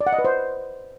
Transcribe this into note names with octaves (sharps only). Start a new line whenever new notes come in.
D5
F#5
D#5
B4
C5